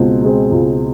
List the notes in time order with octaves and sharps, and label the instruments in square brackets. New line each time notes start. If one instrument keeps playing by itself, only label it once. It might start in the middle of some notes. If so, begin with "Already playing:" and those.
Already playing: [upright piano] C#2 B2 G#3 C4
B2 G#3 C4
C#2